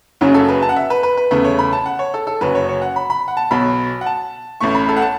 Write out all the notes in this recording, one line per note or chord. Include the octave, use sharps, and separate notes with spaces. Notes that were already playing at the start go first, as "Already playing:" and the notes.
F#1 F#2 C#3 F#3
A4
B4
A5
F#5
E5
B4
B4
B4
E2 C#3 A3 B4
C#5
B5
A5
F#5
C#5
A4
A4
F#1 F#2 F#3 B4
C#5
C#5
F#5
B5
B5
F#5
A5
B1 B2 F#3 B5
F#5
A5
A1 A2 A3 C#6
B5
A4
F#5
A5